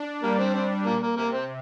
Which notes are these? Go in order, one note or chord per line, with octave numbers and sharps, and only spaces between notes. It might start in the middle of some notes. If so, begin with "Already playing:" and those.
Already playing: D4
G3 A#3
C4
C4
A#2 A#3
A#3
C3 A#3
C4